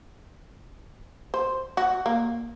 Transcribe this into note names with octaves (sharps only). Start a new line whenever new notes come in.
C5
F#4
A#3